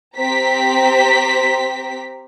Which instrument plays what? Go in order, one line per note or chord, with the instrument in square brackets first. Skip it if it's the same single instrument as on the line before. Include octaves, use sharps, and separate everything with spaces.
[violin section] C4 G4 C5 A#5 B6